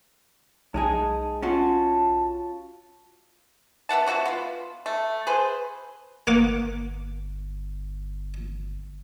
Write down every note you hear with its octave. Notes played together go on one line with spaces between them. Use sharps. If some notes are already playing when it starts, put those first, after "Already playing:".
B1 G#3 D#4 G#4 A5
C#4 F4 F#4 A5
B3 E5 F#5 A5
F3 F#4 G#4 E5
B3 F4
A3
G#4 B4 C5
G1 A#3 F#5 D6